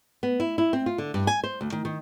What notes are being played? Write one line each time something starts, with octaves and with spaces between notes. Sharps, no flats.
B3
E4
E4
C4
F4
D3
G2
G#5
C5
D2
D#3
D#3